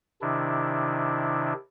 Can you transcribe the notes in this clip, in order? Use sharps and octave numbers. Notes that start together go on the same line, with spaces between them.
C3 D#3 D4 E4